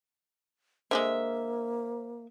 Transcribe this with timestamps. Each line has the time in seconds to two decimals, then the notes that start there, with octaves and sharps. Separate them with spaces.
0.91 D3 F3 G#3 A#3 C5 E5